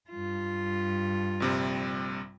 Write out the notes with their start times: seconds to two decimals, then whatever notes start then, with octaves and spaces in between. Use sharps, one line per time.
0.11 G2 F4
1.40 A#1 C3 G3